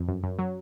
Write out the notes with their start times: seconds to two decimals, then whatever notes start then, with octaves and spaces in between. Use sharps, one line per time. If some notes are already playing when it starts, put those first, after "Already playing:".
Already playing: F2
0.08 F#2
0.23 F#2
0.39 F#3